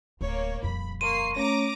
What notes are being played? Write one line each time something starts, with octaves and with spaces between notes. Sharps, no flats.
D1 A#3 C#5
D#1 F2 B5
A#3 C6 C#6 C7 D#7
A3 C#4 C#5 A#5 D6 A#6